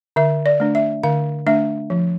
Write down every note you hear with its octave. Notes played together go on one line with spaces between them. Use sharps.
D3 E5
D5
A3 D4
E5
D3 F5
A3 D4 E5
F3